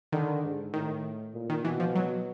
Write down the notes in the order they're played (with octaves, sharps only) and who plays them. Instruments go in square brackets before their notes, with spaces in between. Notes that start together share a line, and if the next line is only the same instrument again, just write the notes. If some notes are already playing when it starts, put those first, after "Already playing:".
[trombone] D3 [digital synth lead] D#3
[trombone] G#2
[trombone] A2 [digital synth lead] D#3
[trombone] A#2
[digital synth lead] D#3
[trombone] B2 [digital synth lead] E3
[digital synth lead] F3
F#3